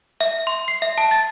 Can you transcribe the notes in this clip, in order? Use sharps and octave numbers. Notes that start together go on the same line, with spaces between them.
E5
C6
C7
E5
A5
A6